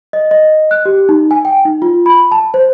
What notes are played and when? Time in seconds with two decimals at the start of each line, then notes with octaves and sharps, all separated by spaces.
0.13 D#5
0.31 D#5
0.71 F#6
0.86 G4
1.09 D#4
1.31 G#5
1.45 G5
1.65 D#4
1.82 F4
2.06 B5
2.32 A5
2.54 C5